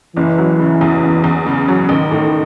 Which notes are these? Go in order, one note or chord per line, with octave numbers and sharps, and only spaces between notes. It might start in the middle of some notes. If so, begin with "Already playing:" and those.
F#1 E3
F#3
C#3
E2
F#1
E2
C#3
F#3
A1 D#3
A2